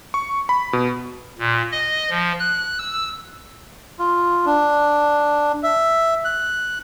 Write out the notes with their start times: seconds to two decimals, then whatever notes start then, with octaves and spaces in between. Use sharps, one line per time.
0.14 C#6
0.49 B5
0.73 B2
1.38 A#2
1.72 D#5
2.10 F3
2.40 F#6
2.79 E6
3.99 F4
4.46 D4
5.63 E5
6.25 F#6